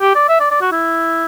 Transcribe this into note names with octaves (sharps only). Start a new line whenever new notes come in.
G4
D5
E5
D5
D5
F#4
E4